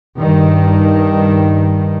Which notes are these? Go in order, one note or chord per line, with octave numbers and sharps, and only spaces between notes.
G2 D#3